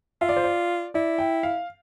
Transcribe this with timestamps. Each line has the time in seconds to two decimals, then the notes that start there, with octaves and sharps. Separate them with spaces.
0.21 F4 E5
0.29 D5
0.37 C5
0.44 D5
0.94 E4 D5
1.18 G5
1.43 F5